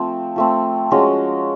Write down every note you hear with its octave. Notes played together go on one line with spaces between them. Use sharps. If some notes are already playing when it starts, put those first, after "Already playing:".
Already playing: F3 A3 C4
F3 A3 C4
F3 G#3 C#4 F#4